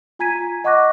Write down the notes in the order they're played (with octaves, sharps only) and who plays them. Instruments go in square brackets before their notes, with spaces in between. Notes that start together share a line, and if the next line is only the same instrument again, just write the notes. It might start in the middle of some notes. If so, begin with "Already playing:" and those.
[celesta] F4 G#5 A#5 G#6 B6 D#7
D#5 F#5 C#6 D6 F#6 A#6